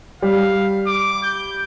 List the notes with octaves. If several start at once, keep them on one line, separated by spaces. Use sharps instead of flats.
G3 F5
D6
G6